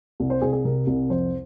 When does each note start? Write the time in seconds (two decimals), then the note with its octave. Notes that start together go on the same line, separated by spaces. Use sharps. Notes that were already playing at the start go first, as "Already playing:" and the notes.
0.20 C2
0.30 C5
0.41 C2 G#4
0.53 G#4
0.65 C3 A#4
0.87 C2
1.10 F2 C5